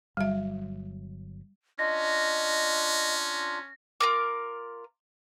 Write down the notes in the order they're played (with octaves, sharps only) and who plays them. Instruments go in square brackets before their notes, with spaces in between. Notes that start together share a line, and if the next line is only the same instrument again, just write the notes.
[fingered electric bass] G1 F#3 [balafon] G3 E5
[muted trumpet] C#4 [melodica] D4 F4 [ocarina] D#5 [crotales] A#6
[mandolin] F4 A#4 D6